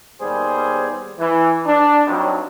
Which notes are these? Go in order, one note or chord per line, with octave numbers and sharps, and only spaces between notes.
D#2 G3 B3 G#4 C5
E3
D4
G2 F#3 C4 D#4